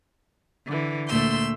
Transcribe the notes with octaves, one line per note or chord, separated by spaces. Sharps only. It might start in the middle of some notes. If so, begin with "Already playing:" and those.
D3 E3
D2 A#2 A3 C6 E6 G6